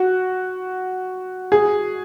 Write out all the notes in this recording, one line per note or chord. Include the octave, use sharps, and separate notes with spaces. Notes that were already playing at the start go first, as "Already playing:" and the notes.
Already playing: F#4
G#4